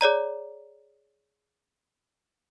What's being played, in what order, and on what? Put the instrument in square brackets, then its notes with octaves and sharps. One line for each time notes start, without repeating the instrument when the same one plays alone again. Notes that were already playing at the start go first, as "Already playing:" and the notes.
[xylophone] G#4 C#5 D5 A#5